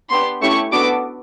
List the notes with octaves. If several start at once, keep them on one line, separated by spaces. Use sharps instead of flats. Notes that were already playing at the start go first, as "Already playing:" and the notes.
B3 D4 G4 C6
A3 C#4 E4 G4 C#6
B3 D4 F#4 A4 D6